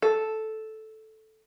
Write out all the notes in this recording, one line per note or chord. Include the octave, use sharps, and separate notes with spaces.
A4